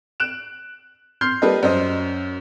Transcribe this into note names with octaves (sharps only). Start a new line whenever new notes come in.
F#6 D7 E7
C6 F6 G6 C7
G3 A#3 A4 B4 D#5
F#2 C5 D#5